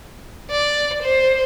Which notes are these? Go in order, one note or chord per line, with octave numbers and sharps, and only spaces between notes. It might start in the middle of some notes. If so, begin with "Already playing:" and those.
D5
C5